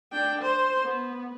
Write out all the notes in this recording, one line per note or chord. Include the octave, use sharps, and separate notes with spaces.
D4 G5
C5
B3